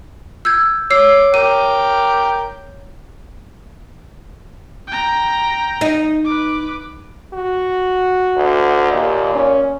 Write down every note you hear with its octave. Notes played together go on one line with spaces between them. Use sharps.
E6 G6 G#6
C#5 D6 E6 C7
A#4 G5 D6 D#7
G5 A#5
D#4
B4 D6
F#4
D2
D#2 A#2
C#4